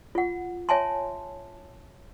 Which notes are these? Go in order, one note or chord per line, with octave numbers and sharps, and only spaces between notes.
F4 F#5
C#5 E5 G#5 A5 C6